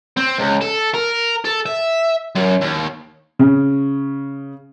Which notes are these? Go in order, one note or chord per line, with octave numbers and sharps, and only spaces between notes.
C4
C#2
A4
A#4
A4
E5
F#2
D#2
C#3